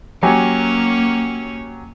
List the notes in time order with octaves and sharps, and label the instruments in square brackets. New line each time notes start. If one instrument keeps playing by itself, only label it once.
[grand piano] F#3 G4 G#5 [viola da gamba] A#3 C#4 C#5